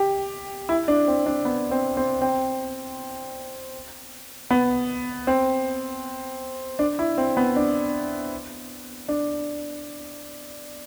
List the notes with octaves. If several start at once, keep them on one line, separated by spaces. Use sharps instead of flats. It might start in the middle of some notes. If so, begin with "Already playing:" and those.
Already playing: G4
E4
D4
C4
D4
B3
C4
C4
C4
B3
C4
D4
E4
C4
B3
D4
D4